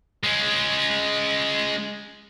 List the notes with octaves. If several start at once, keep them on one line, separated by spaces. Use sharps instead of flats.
G#3 C#4